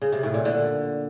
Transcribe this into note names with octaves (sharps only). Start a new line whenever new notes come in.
C#3
C3
A2
A#2
D3